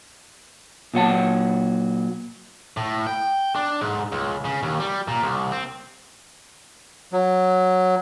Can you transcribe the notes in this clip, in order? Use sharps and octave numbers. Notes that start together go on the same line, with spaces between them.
A#2 F#3 F#5 A5
A2
G5
D4
G#2
C#2
C#3
D#2
G3
A#2
C2
C4
F#3